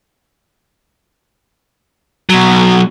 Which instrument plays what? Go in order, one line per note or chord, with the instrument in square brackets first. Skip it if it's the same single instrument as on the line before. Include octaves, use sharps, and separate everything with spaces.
[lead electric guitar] B2 F#3